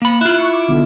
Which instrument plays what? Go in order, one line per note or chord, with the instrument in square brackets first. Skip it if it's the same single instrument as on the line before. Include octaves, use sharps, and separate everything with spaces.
[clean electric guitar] A#3 B5
[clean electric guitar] E4 F4 [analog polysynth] F#6
[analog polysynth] C#6
D6
B1 B2 D3